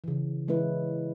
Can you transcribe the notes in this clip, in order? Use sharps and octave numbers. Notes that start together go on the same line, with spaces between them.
C#3 E3
E3 G#3 C#4 E4 B4